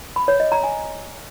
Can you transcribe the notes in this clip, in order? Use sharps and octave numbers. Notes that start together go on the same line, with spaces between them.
B5
C#5
D#5
A#5
G#5